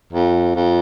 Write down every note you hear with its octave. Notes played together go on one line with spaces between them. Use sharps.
F2
F2